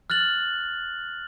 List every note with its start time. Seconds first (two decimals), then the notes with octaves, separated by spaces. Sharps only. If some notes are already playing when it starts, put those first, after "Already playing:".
0.10 F6 F#6 A6 F#7